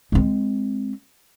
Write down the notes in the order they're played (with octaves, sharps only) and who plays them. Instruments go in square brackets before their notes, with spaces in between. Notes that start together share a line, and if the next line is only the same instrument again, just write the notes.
[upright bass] G#3 C4